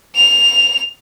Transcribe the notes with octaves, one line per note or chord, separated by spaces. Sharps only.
F7